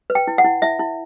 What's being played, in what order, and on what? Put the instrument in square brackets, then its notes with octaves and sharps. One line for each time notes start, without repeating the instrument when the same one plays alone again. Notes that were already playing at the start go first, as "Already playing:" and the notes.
[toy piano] B4
G5
E4
F#5
E4
E4 E5
E4